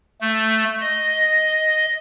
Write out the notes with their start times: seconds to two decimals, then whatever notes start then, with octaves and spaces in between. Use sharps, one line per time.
0.21 A3
0.81 D#5